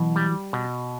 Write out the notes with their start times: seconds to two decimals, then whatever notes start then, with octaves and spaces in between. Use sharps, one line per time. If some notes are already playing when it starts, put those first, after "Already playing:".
Already playing: B2 E3 F#3
0.16 G3
0.53 B2